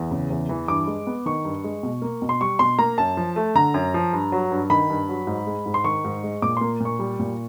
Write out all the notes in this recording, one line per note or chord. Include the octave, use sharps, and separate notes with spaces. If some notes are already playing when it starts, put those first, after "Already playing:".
Already playing: E2
C#3
E2
E3
G2 D6
G#3
B3
D#3 C#6
G2
G#3
B2
A#3
B2
C6
G3 C#6
B2 C6
A#3 A#5
F#2 A5
F3
A3
D3 A#5
F#2
F3
G2
F#3
G2
D#3 B5
G2
F#3
G#2
G#3
G#2
C6
D#3 C#6
G#2
G#3
A#2 D6
A#3 C6
A#2 C#6
G3
A#2